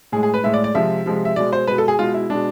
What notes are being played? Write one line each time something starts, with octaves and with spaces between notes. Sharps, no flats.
A2 G#3 G#4
G#4
B4
A2 G#3 E5
D5
D5
C3 F3 G#3 E5
C3 F3 G#3
E5
B2 G#3 D5
C5
B2 G#3 B4
A4
G#4
B2 G#3 F4
E4
B2 G#3 D4